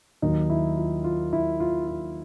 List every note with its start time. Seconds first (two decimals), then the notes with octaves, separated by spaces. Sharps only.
0.22 D#2 D#3 F#3 D#4
0.50 E4
0.77 F4
1.04 F4
1.33 E4
1.60 F4
1.88 F4